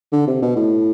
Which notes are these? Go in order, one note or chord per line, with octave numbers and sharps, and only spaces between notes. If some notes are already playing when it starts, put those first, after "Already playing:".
D3
C3
B2
A2